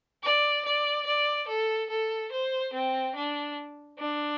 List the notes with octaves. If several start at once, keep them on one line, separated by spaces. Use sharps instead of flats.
D5
D5
D5
A4
A4
C5
C4
D4
D4